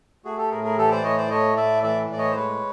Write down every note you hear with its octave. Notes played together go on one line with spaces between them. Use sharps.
A3 F#4 G#4
G4 A4
A2 G#4 A#4
G#4 A#4
E3 G4 A4
C5 D5
A2 C#5 D#5
C5 D5
A3 C#5 D#5
A2 D5 E5
E3 D5 E5
A2 D5
C#5 D#5
C5
G#3 B4 C#5